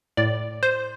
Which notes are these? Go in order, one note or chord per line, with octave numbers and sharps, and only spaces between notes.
A2 D5
C5